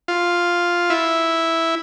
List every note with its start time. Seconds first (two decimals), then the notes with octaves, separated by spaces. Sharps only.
0.08 F4
0.90 E4